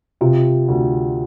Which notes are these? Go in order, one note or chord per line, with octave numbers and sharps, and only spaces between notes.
C3 F4
D2